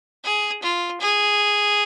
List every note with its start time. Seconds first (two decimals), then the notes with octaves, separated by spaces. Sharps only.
0.24 G#4
0.63 F4
1.01 G#4